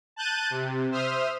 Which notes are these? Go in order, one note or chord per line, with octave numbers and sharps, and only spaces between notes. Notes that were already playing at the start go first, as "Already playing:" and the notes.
A5 F#6 G6 A6 D#7
C3
C5 E5 D#6 F6